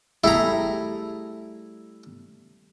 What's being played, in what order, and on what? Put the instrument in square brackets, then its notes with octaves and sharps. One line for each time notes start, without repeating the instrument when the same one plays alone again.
[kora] G3 A3 G#4 [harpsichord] E4 A#5